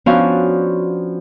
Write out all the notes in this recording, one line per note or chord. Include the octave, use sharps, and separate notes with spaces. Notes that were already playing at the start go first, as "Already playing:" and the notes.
F3 B3 C#4 D4 F#4 F5